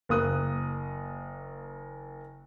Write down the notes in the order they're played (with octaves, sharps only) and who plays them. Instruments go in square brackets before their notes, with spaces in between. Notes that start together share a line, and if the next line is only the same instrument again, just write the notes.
[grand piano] F#1 A#3 D#6 F#6